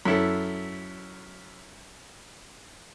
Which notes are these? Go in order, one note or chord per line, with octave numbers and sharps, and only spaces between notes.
F#2 E4 A4